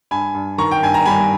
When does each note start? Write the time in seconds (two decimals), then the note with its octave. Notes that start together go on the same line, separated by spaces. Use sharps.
0.11 G2 G#5 B5
0.35 G2
0.58 D#3 A#5 C#6
0.71 G5
0.83 G2 G#5
0.94 A#5
1.05 G3 G#5 B5